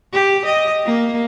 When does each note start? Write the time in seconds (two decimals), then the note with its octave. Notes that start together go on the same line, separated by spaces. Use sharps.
0.13 G4
0.45 D#5
0.85 A#3